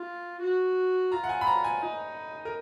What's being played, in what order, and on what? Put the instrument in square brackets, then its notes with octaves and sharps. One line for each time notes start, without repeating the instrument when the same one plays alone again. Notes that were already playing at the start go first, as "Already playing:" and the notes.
Already playing: [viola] F4
F#4
[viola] F4 [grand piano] A#5
[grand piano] F#5
G#5
B5
A#5
G#5
[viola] D#4
[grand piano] A#4